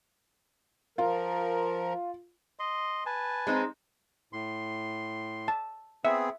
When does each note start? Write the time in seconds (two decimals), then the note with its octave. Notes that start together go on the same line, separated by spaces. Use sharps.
0.98 F3 F4 A#4
2.59 D#5 C6
3.06 B4 G#5 A5
3.47 G#3 C4 D#4
4.33 A2 C6
5.48 A5
6.05 B3 C4 G#4 E5